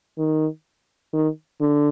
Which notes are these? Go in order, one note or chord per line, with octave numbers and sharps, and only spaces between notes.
D#3
D#3
D3